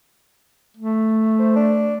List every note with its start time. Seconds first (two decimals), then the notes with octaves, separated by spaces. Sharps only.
0.77 A3
1.39 C5
1.56 D4